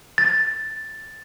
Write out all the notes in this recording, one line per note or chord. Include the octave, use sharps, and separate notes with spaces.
A6